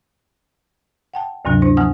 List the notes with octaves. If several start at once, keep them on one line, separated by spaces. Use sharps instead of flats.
F#5 G5 A5
D2 G2 C3 F#3 D4
D4 E4 C5
F3 B3 F#5 G#5 D#6